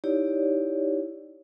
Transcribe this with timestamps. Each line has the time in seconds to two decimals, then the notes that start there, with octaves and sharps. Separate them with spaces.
0.04 D#4 E4 G4 C#5 D5